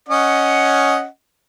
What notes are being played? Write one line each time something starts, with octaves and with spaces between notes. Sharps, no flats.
C#4 D#5 F#5